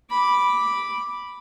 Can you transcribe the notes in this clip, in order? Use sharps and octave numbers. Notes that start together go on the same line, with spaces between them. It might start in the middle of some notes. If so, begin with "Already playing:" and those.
B5 D6